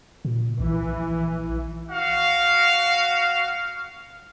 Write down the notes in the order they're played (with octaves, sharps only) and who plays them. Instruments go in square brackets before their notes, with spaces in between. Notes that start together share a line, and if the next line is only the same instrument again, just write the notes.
[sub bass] A#2
[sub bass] A#1 [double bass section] E3
[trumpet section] F#4 F5